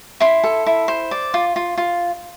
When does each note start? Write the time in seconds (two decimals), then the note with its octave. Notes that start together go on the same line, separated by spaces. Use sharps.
0.20 E4 C6
0.44 A4
0.66 E4
0.88 C5
1.11 D5
1.34 F4
1.56 F4
1.78 F4